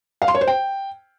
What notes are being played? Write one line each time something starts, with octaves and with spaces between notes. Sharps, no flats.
F5
C6
C#5
C5
G5